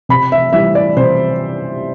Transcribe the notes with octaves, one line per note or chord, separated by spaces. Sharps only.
C3 B5
E5
E3 G3 E5
D5
C3 C5